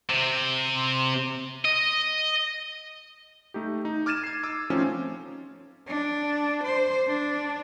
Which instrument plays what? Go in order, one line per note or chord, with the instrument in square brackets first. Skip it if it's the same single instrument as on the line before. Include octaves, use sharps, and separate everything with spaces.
[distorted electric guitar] C3
D#5
[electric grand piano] A3 D#4 G4
D#4
D6 F6 G#6 A6 D#7 E7
G#6 C7
D6 E6
F3 A3 C4 C#4 D#4 F4
[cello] D4
C5
D4